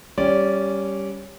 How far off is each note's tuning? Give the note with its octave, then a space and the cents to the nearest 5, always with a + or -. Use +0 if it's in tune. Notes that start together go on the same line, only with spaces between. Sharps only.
G3 +0 C#4 +0 D5 -15